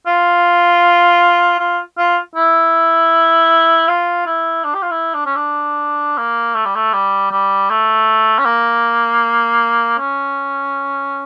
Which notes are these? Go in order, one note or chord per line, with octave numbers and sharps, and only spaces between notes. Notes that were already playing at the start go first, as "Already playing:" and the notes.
F4
F4
F4
E4
F4
E4
D4
G4
F4
E4
D4
C#4
D4
A#3
A3
G3
A3
G3
G3
A3
C#4
A#3
C#4